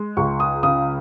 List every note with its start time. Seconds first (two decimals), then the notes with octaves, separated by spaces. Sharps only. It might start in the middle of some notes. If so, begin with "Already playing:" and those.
Already playing: G#3
0.17 C#2 C#6
0.40 D#6
0.63 C#3 D#6